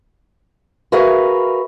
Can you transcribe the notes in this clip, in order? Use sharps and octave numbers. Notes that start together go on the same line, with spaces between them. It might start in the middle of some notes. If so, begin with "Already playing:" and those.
F#4 G#4 A#4 B4 E5 F5